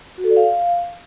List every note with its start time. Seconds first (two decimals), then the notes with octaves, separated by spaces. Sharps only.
0.18 F#4
0.24 A4
0.30 D5
0.37 F5